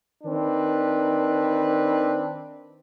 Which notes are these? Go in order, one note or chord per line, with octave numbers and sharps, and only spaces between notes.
D#3 C4 D4 B4